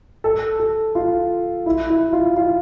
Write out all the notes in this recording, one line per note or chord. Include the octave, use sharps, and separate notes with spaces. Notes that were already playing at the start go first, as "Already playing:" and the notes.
A4
A4
F4
E4
E4
F4
F4